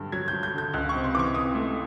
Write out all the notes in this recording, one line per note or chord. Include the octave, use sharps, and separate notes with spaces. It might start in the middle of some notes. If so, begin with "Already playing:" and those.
Already playing: G2 D3 F#3
F#3 G#6
G6
F#3
G6
D3 G6
C#2 F#6
C#6
C3
C6
E3 D6
C#6
C3 D#6
A3